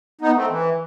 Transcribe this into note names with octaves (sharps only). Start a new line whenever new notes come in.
B3 D#4
A3 C4
E3